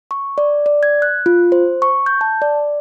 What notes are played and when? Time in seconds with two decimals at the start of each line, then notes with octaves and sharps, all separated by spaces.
0.11 C#6
0.38 D5
0.66 D5
0.83 G#6
1.02 F#6
1.26 F4
1.52 C5
1.82 C#6
2.06 G6
2.21 A5
2.42 D5